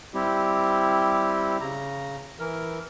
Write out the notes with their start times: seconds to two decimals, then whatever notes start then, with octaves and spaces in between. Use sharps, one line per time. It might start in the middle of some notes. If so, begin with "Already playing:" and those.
0.14 G3 C4 E4 G4
1.61 C#3 A#5
2.39 E3 A#4